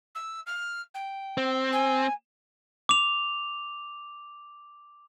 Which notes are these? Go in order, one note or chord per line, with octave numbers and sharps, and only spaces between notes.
E6
F6
G5
C4
G#5
D6 F7